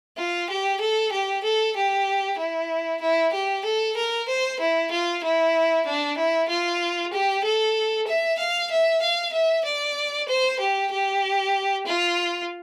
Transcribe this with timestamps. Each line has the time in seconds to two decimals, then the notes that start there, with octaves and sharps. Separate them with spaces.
0.17 F4
0.49 G4
0.80 A4
1.12 G4
1.44 A4
1.76 G4
2.39 E4
3.01 E4
3.33 G4
3.65 A4
3.96 A#4
4.28 C5
4.60 E4
4.91 F4
5.23 E4
5.86 D4
6.17 E4
6.49 F4
7.12 G4
7.44 A4
8.07 E5
8.39 F5
8.70 E5
9.02 F5
9.33 E5
9.65 D5
10.28 C5
10.59 G4
10.91 G4
11.86 F4